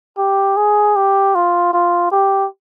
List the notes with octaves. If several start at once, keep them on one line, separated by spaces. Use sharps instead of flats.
G4
G#4
G4
F4
F4
G4